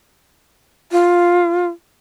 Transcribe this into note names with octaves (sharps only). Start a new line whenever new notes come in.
F4